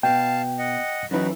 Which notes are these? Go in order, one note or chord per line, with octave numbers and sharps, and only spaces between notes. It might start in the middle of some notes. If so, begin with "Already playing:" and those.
B2 F5 G5 A5
D#5 F#5
F#2 E3 D#4 F#4 B4